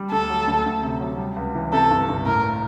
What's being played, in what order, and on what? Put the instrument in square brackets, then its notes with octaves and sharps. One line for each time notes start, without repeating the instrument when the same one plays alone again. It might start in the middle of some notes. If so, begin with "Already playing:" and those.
Already playing: [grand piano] G3
[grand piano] D2 [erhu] A4
[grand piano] F#3
D2
D2
C3
F#3
G3
C#2
E3
[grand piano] C3 [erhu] A4
[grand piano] G1
G1
[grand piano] A2 [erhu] A#4